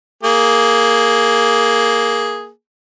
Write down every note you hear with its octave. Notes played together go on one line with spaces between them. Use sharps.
A#3 G#4